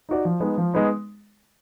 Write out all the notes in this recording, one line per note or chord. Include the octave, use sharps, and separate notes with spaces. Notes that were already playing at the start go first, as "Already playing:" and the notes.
D#4 F#4 D5
F3
G#3 B3 D#4
F3
G#3 B3 D#4